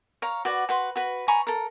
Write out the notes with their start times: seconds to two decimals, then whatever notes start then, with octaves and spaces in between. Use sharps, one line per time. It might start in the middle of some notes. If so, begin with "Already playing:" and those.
0.22 C#5 F5 A#5
0.45 F#4 B4 D5 F#5
0.69 F#4 B4 C6
0.96 F#4 B4
1.28 G#5 A#5 B5 C#6
1.47 A4 A#4